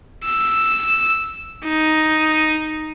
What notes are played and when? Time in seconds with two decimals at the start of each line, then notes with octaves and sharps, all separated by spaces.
0.25 E6
1.65 D#4